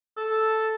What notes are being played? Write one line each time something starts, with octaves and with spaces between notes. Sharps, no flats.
A4